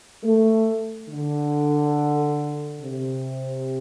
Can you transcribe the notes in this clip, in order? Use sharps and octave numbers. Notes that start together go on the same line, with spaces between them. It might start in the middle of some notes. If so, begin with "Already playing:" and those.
A3
D3
C3